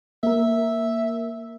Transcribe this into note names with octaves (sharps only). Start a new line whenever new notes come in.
A#3 A#4 E5